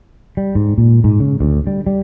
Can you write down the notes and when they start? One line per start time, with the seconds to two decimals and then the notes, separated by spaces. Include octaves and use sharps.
0.37 G3
0.55 G#2
0.78 A#2
1.04 G#2
1.20 C#3
1.41 D2
1.67 G3
1.87 G3